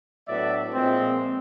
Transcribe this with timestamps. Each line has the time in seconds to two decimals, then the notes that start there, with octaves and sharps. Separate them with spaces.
0.27 A2 F#3 B3 D4 D5 E5
0.72 A#2 F3 G#3 C4